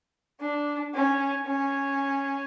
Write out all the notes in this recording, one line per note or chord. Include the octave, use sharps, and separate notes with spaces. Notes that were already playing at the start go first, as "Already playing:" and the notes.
D4
C#4
C#4